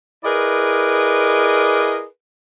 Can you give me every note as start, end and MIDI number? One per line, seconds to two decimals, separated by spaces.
0.24 2.04 64
0.24 2.04 68
0.24 2.04 70
0.24 2.04 71
0.24 2.04 74
0.24 2.04 75